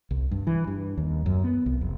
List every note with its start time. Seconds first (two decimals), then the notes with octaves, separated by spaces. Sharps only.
0.11 C2
0.31 G2
0.47 E3
0.67 G2
0.98 D#2
1.26 F#2
1.44 B3
1.66 C2
1.81 F1